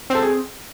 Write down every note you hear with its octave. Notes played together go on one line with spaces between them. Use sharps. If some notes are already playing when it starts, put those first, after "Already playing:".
C4 A4
G#4